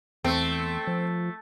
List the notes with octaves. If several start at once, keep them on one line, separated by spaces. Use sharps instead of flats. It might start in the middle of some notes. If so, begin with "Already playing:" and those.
E2 A3 C4
F3